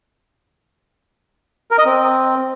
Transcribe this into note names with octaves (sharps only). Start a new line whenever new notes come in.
A#4
D#5
C4